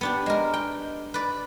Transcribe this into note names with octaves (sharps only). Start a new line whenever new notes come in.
B3 D4 G4
G#3 A#4
G5
B4 D5